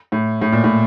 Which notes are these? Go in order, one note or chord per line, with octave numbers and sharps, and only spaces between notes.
A2
A2
A#2
A2